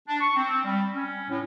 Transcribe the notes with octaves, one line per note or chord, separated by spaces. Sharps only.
D4
C#6
C4
G3
C#4
A2